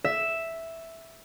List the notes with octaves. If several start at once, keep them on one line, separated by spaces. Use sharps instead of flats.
E5